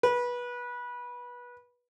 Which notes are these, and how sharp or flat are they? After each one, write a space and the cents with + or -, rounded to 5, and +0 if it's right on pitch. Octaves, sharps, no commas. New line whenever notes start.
B4 -20